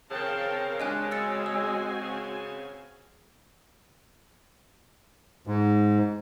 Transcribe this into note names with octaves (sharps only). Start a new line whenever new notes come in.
C#3 C4 A#4 F5 G5 A5
G#3 D4 D#5 G#5 F#6
C4 F#4 G#5 E6 A6 C#7
E6
C#3
G#2